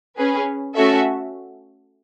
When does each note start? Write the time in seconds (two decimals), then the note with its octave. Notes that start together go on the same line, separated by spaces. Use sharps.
0.17 C#4 G#4 B4
0.74 A3 C#4 F#4 A4 E5